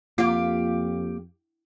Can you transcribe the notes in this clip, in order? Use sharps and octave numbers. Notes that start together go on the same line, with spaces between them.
F2 A#3 F4 G4 F5